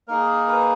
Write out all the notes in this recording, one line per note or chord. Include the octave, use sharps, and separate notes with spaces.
A#3 D#4 G#4 A#4
B4